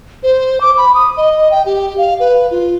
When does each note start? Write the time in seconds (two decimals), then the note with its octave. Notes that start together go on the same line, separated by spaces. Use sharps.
0.23 C5
0.61 D6
0.77 B5
0.95 D#6
1.17 D#5
1.51 G5
1.66 G4
1.98 F5
2.20 B4
2.51 F4